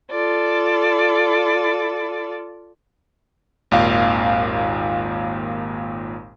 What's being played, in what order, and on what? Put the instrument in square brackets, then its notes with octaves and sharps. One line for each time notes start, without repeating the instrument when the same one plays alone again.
[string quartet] F4 A4 D5
[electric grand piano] G#1 D#2 A#2 F5